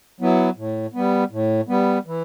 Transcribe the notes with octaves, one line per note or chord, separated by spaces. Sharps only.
F#3 B3 E4
A2
G3 B3
A2
G3 B3
E3